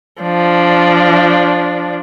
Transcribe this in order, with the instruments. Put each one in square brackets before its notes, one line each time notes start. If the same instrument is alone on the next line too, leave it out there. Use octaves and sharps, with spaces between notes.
[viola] F3 D4